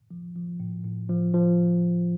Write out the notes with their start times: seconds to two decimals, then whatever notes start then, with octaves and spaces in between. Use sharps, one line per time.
0.11 F3
0.36 F3
0.60 A2
0.85 A2
1.09 F3
1.34 F3